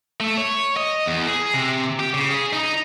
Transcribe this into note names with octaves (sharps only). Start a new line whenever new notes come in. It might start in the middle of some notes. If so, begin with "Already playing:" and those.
A3
C#5
D#5
E2
G#4
C3
G4
C#3
G#4
D#4